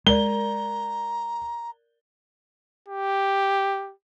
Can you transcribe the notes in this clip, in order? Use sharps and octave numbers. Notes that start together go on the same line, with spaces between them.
G#3 A#4 D5 A#5 G7
G4